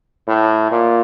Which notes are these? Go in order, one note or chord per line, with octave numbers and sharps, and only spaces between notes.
A2
A#2